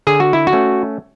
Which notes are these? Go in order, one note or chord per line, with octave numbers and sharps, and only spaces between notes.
D3 G#4
F#4
E4
F#4
A3 C#4